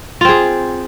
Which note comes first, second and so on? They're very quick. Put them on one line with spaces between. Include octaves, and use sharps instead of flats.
F4 C4 G#4